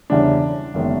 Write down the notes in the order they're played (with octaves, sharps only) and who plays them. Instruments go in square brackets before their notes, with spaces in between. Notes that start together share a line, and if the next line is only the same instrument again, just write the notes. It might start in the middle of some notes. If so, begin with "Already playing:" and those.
[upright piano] E1 E2 C#3 E3 G3 D4
F#1 F#2 D#3 G#3 B3